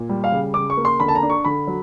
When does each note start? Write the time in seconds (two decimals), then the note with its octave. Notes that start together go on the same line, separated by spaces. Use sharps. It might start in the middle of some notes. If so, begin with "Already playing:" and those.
Already playing: A#2
0.09 G3
0.24 F5
0.32 C#3
0.54 C#3 D6
0.70 C#6
0.77 A#3
0.85 C6
1.00 D3 B5
1.08 A5
1.15 A#5
1.23 D4
1.30 C#6
1.45 D3 B5
1.67 F#3